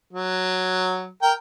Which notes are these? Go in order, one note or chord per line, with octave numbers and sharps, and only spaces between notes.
F#3
A#4 G5